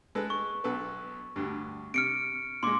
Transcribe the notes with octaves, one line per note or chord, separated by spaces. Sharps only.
G#3 A4 B4
C#6
B1 A4 B4
D2 G2
C3 F6 C#7 D7
A#2 G#3 C6 D6